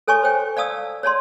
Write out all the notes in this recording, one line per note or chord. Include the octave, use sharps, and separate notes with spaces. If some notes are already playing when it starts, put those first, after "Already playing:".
A4 C#5 G#5 A5 C#6
C5 C#5 G5
D5 F5 A5 D#6 E6
C#5 D5 A5 C6